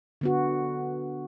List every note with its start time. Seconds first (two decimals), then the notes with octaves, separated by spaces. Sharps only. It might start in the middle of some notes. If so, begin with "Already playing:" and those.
0.21 D3 B3 F#4